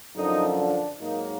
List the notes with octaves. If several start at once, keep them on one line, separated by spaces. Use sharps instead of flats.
F#2 D3 F3 D#4
D4
G#2 F#3 A#3 D#4